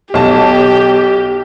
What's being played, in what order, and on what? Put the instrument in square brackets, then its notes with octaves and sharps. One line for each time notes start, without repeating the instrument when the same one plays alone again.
[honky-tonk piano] B1 A5 [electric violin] G4